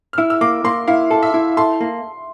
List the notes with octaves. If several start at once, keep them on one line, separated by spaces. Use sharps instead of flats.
F6
E4 E6
E6
A#3 D6
A#3 C6
E4 F5
A4
E5
E4
A4 C6
A#3